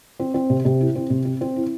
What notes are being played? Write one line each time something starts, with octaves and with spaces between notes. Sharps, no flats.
C4
C4
C3
C3
E4
C4
C3
C4
C4
E4